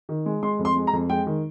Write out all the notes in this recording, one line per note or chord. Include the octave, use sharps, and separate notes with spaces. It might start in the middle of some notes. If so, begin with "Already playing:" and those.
D#3
G#3
G#3 C6
F2
C6
G#3
A#5
F2
G#3 G5
D#3